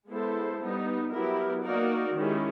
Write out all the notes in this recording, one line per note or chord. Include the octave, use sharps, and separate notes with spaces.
G#3 B3 E4 A4 C5
G3 B3 D#4
F#3 B3 E4 G4 A#4
A#3 D#4 F#4 A#4 D5
D#3 G#3 C#4 E4 G4